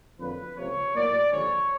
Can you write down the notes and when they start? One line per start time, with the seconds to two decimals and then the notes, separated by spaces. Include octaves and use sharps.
0.19 F2 D3 F#3 A#3 B4
0.56 C#2 C3 F3 A#3 C#5
0.93 A2 F#3 A#3 D5
1.31 D#2 D3 F3 G#3 C#5